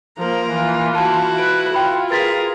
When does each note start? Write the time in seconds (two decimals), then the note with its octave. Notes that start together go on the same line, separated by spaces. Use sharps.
0.18 F3 A#3 A#4
0.52 E3 F4
0.95 E4 F#4 A5
1.38 B4 D7
1.74 F4 G5 B5
2.10 G#4 A#4 B4 A6 B6